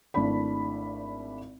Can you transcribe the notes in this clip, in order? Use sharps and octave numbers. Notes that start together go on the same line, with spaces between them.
G#1 A3 D4 E4 D5 B5